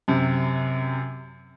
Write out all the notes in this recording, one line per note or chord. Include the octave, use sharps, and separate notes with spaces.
F#2 C3